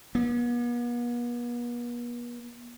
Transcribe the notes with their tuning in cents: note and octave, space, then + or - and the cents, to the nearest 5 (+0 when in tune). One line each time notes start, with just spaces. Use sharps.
B3 -45